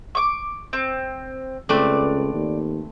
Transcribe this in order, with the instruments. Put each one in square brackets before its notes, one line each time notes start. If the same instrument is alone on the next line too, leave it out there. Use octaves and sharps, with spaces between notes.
[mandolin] C#6 D6
C4
[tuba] C#2 [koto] A3 C4 B4 [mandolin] D5
[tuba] D#2